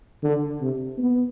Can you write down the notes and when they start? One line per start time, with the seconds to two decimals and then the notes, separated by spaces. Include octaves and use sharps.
0.23 D3
0.61 C3
0.98 B3